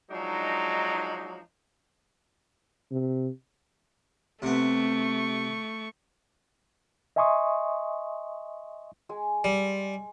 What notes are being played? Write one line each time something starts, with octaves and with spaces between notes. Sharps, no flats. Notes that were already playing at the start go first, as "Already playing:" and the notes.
F3 F#3 G#3 D4 D#4
C3
C3 A3 B3 C#6
D#5 E5 G#5 C6 C#6 D#6
G#3 G#5
G3